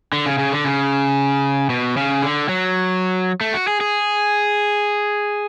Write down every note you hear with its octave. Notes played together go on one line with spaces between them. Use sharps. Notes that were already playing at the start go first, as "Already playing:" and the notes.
D3
C#3
C#3
D3
C#3
B2
C#3
D3
F#3
A3
F#4
G#4
G#4